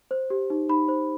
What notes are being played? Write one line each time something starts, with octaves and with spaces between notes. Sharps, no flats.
C5
G4
D#4
D#4 B5
C5